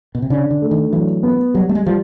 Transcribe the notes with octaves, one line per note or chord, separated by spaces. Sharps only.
B2
C3
C#3 D4
D3
A3
D#3
E3 F#3
B3
F#3 G3
A3
G#3
F3 G3